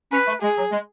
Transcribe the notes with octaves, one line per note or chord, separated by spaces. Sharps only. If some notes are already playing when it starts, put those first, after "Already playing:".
C#4 B4
A3
G#3 G#4
F#3
G#3